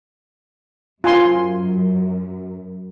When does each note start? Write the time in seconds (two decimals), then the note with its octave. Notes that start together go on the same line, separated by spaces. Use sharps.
1.04 F#2 F4 G#5 C6